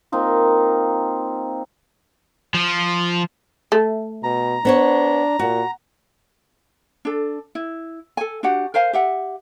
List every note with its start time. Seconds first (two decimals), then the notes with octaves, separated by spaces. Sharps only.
0.12 A#3 C4 D#4 F4
2.54 F3
3.72 A3
4.23 B2 A#5
4.65 B3 D4 C5 C#5
5.39 A#2 F#4
7.05 D4 A4
7.55 E4
8.17 A4 G#5
8.43 D4 F#4 G4 F#5
8.74 A#4 C5 F5 G#5
8.93 G4 E5 F#5